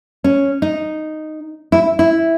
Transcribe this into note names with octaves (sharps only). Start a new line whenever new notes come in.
C#4
D#4
E4
E4